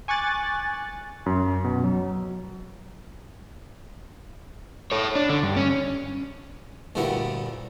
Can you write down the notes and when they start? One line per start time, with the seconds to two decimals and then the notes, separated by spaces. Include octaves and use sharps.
0.08 G#5 C#6 D6 F#6 A6
1.26 F#2
1.64 B2
1.84 F#3
4.92 A4 C#5
5.15 D4
5.29 D3
5.43 G2
5.56 C#4
6.95 D2 G2 A#2 G3 E4 F#5